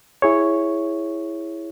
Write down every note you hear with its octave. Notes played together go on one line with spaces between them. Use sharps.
E4 G#4 C#5